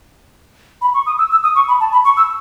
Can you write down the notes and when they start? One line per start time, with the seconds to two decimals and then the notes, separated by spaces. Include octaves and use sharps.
0.82 B5
0.94 C#6
1.06 D#6
1.19 E6
1.31 E6
1.43 D#6
1.55 C#6
1.68 B5
1.80 A5
1.92 B5
2.05 C#6
2.17 E6